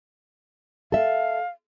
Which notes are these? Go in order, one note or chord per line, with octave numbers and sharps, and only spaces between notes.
A4 E5 F5